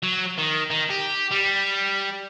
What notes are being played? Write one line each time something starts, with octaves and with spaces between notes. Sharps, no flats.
F#3
D#3
D#3
G4
G3